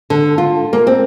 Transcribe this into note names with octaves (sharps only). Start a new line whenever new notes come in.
D3
F4
A#3
C4